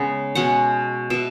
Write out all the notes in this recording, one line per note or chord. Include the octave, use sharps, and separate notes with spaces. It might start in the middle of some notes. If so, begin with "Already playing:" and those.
Already playing: C#3 G#3 B3
B2 G#3 C#4 F#5
B2 B3 E5